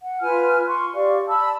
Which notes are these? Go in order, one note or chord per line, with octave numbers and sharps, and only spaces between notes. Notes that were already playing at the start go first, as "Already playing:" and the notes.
F#5
F4 B4 G#5 F6
C6 C#6
G4 D5 F5 C#6
A5 B5 E6